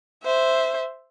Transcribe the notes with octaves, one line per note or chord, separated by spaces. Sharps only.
C5 E5